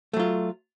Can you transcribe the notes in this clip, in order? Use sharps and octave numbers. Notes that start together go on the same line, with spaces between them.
F#3 A3 F4